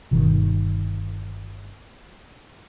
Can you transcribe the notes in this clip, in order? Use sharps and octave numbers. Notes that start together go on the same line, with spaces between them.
G1 B2 D#3